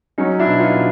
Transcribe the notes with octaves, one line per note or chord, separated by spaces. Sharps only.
F#3 C#4 D#4
D4 E4
B2
D#4 F4
B2